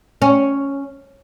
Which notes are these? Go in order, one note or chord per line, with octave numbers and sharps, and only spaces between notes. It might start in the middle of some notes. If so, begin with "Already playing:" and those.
C#4